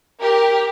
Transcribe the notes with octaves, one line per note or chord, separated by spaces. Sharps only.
G4 A#4